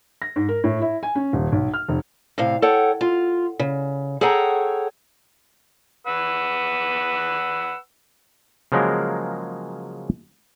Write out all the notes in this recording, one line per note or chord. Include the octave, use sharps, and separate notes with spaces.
A#6
G#2
A#4
A2
E4
G#5
C#4
D#1
B1
F6
F1
A2 C3 F5
A4 C#5 F#5 G5
F4
C#3
G#4 A4 C#5 F#5 G5 A#5
B4 F#5 E6
C#3 F3 F#3 G#3 A#3 A#4